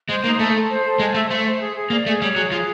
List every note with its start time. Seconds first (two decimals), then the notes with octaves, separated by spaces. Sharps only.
0.09 G#3 C5
0.24 A#3 D#4
0.39 A3 A4
0.55 A4
0.70 C5
0.85 A4
0.99 G#3 G#5
1.14 A3 E5
1.30 A3 C5
1.45 C5
1.61 G#4
1.76 G#4
1.90 A#3 D5
2.06 A3 G#4
2.21 G3 C#5
2.36 F#3 G#4
2.51 F3 G#4